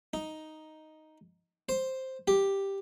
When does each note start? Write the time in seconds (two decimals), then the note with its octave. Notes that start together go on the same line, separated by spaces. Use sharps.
0.14 D#4
1.69 C5
2.28 G4